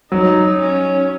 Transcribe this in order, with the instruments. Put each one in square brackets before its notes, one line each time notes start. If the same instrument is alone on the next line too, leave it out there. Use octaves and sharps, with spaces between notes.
[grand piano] F#3 [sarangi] D#4
[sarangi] C#4